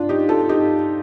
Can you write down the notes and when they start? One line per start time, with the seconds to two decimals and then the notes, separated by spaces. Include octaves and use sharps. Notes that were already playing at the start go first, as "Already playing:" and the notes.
Already playing: D4 F4
0.09 D#4 G4
0.29 F4 A4
0.49 D#4 G4